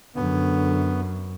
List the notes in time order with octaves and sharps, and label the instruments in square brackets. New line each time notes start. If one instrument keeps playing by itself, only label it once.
[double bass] F#2 [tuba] D3 [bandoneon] B3